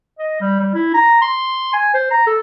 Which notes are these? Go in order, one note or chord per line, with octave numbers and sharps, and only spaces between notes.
D#5
G3
G3
E4
A#5
C6
G#5
C5
A#5
A4